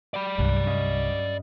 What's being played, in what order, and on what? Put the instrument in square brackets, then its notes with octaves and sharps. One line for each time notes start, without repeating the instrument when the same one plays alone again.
[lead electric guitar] D5 B5
[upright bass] C2 [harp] G2 F#6
[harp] C#4 D#5 F5